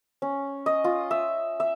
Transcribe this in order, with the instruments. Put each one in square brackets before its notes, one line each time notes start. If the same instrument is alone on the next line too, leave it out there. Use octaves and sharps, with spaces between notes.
[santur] C#4
D#5
F4
E5
E5